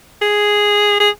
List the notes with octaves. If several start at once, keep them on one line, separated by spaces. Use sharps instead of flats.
G#4
G#4